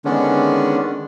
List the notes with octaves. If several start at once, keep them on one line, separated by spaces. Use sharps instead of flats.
D3 D#3 G#3 B3 C#4 D4